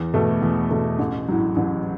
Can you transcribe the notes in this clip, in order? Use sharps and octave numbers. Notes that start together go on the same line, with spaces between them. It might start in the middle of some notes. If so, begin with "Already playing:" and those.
Already playing: E2
B2 A3
E2
B2 A3
A1
A2 F#3
A1